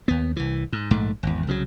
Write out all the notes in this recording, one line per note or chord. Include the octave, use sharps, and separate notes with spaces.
D#2 B3
C2 E3
G#2
A#1 G#2 A3
G#1 E2
C2 C#3 F3 F#3